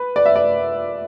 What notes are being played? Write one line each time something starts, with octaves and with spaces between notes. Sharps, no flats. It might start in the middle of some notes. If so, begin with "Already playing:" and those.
Already playing: B4
D5
E5
D5